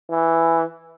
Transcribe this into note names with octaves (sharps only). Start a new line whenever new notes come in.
E3